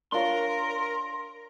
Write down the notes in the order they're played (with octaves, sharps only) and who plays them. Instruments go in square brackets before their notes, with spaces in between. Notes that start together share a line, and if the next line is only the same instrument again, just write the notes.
[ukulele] D4 F4 C#5 [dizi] A#4 [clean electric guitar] C6